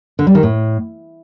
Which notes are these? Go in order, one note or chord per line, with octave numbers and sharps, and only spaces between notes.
D3
G3
D#3
A2